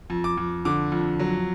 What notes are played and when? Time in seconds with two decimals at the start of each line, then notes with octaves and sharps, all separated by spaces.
0.10 F2
0.24 D6
0.37 F2
0.65 D3 D6
0.92 F2
1.19 F#3